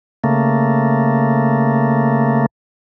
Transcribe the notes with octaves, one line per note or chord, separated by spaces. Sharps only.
C#3 A3 A#3